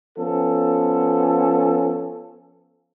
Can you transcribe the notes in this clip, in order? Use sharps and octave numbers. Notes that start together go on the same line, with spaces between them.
F3 B3 C#4 A4